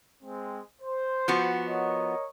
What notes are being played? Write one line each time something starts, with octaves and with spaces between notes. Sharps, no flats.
G#3 C4
C5
F3 B3 F#4
A#4 C#5 D#5